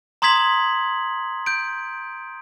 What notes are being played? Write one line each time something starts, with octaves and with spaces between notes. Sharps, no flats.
A#5 C6 D#6 G#6 B6 F#7
G6 D7